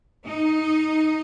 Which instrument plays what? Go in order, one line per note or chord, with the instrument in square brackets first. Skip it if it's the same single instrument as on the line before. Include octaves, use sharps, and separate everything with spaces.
[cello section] D#4